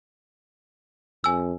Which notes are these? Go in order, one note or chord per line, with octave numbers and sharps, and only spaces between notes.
F2 G#5 E6